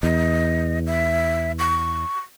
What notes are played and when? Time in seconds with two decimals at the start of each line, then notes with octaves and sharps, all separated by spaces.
0.03 E2 D#5
0.86 E5
1.59 C#6